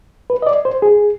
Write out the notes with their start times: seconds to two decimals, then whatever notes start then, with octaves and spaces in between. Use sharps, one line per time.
0.30 B4
0.42 D#5
0.47 D5
0.65 C5
0.82 G#4